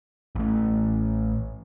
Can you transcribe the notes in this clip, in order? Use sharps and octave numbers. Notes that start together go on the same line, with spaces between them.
A1 A3